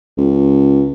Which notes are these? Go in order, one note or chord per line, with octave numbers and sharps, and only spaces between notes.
C#2